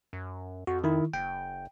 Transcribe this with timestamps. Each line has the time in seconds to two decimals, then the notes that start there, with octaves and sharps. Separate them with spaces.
0.13 F#2
0.67 F2 F#4
0.84 D#3 E4
1.14 F#1 G5